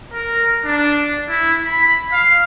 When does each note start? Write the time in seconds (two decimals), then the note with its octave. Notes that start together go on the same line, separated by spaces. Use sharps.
0.14 A#4
0.64 D4
1.30 E4
1.67 B5
2.12 F5